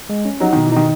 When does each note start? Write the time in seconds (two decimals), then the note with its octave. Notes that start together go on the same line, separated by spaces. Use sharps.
0.09 G#3
0.25 C#4
0.40 F#3 D#4
0.53 B2 D#3
0.65 E3
0.72 D#3 D#4